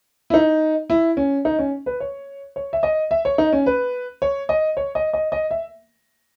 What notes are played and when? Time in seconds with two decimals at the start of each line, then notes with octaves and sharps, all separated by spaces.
0.30 E4
0.34 D#4
0.90 E4
1.17 C#4
1.45 D#4
1.59 C#4
1.86 B4
2.00 C#5
2.56 C#5
2.73 E5
2.83 D#5
3.11 E5
3.25 C#5
3.38 D#4
3.53 C#4
3.66 B4
4.22 C#5
4.49 D#5
4.77 C#5
4.95 D#5
5.13 D#5
5.32 D#5
5.51 E5